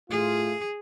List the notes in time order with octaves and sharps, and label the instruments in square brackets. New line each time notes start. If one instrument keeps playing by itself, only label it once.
[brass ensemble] A2 A3 F4 [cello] G#4